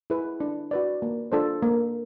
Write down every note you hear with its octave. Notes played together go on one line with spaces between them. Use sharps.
E4 G#4 B4
D4
F#4 B4 D5
A#3
D4 F4 A4 C5
A#3